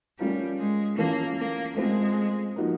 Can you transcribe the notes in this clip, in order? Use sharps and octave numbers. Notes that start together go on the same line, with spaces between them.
G3 A3 C#4 F4 A#4
G#3
E3 A3 A#3 C#4 F4 A4
A#3
G#3 A3 C4 F4
F3 A#3 D#4 F#4 A#4